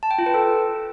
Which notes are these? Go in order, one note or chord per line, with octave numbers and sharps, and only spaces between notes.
A5
G5
F4
B4
A4